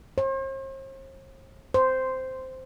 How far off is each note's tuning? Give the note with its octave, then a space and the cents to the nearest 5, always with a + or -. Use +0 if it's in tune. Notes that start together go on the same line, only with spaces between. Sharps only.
C5 +45
C5 -5